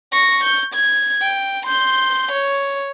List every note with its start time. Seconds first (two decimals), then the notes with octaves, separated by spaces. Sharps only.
0.12 C#6 A#6
0.44 G6
0.74 G#6
1.21 G5
1.66 C6 G6
2.32 C#5